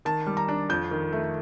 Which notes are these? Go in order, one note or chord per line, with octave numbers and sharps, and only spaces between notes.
D#3 A5
G3
A#5
D4
F2 G6
D#3
A3